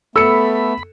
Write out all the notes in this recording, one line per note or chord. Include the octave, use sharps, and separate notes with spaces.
A3 B3 A4 B5 E6 C#7